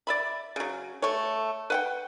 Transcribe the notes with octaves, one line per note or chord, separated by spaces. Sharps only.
D5 E5 B5
C#3 F#3
A3 C#5
B4 F#5 G5